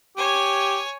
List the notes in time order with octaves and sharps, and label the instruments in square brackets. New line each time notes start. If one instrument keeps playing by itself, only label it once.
[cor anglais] G4 [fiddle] C#5 G#5